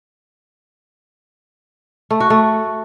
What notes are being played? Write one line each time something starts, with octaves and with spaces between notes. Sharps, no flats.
A3
F#4
A3